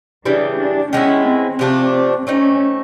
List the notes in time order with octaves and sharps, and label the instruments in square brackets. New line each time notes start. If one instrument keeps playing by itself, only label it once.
[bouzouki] C#3 E3 G3 [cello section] D4
[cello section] D4
[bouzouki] D#3 G#3 B3 E4 [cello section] C#4
[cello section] C4
[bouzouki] C3 F3 A3 D4
[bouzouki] A3 C4 D#4 [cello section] C#4